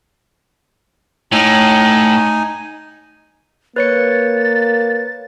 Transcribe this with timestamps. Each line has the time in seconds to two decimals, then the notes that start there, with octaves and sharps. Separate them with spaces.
1.32 A2 D#4 G#5
3.76 A#3 B4 C#5 A6 C#7